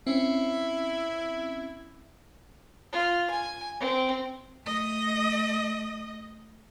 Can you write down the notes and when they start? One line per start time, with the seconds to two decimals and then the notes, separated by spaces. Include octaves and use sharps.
0.07 C4 C#4 E4
2.93 F4
3.30 G#5
3.80 C4
4.65 A3 D#5